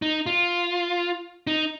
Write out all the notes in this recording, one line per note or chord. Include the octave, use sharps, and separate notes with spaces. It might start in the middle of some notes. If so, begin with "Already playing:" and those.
D#4
F4
D#4